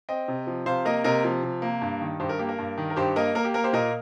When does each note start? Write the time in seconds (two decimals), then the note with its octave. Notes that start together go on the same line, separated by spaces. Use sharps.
0.09 C4 D#5 G5
0.28 C3
0.47 F3
0.66 C3 C5 F5
0.85 A#3 A#4 D#5
1.04 C3 A#4 D#5
1.24 F3
1.43 C3
1.62 A#3
1.82 G2
2.01 D#3
2.20 G2 G4 C5
2.29 A#4
2.39 A#3 G4
2.49 A#4
2.58 G2
2.78 D#3
2.90 A#4
2.96 G2 G4 C5
3.16 A#3 A#4 D#5
3.35 A#3 A#4
3.45 G4
3.54 A#3 A#4
3.64 G4 C5
3.73 A#2 A#4 D#5